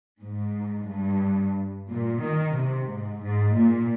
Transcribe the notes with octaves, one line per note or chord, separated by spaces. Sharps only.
G#2
G2
A#2
D#3
C3
G#2
G#2
A#2